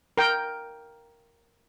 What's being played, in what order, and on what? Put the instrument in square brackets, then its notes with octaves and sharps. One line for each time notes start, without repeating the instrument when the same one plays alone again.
[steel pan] A#4 G5